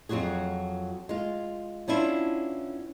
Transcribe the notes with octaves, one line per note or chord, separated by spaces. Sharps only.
F2 F#3 F4 F#4 G#4
G#3 F4
B3 C#4 D4 E4 F4